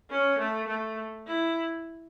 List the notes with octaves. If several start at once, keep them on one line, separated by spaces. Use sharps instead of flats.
C#4
A3
A3
E4